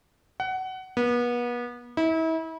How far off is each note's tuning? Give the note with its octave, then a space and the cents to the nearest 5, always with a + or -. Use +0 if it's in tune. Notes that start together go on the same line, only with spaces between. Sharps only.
F#5 +20
B3 -35
E4 -35